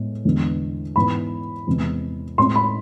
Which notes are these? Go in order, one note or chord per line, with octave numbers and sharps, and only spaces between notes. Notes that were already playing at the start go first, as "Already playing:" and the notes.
Already playing: A2 G#3 B3
E2 D3 G#3 B3
G#2 E3 B3 B5
E2 C3 G#3
A2 G#3 C4 C6
B5